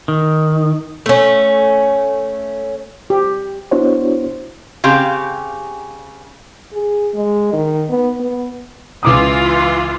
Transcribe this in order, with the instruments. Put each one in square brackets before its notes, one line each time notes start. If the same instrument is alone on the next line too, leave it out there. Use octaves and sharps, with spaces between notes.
[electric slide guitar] D#3
[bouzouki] A3 C#4
[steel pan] G4
[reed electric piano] B3 D4 E4 F#4 C5 C#5
[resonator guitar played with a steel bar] C#3 C4 G4 F5
[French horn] G#4
G#3
D#3
B3
B3
[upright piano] C#2 D6 D#6 [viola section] E3 F4